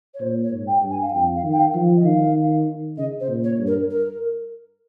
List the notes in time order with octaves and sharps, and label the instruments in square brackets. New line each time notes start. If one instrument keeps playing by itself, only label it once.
[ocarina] C#5
[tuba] A#2 [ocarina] C5
[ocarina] C#5
[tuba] G#2
[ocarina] G5
[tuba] G2
[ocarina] G#5
F5
[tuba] F2 [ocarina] G5
[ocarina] F5
[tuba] D#3
[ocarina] G5
F5
[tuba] F3
[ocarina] D#5
[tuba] D#3 [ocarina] F5
[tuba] C#3 [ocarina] D#5
[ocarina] C5
[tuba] A#2
[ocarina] C#5
[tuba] G2
[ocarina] A#4
A#4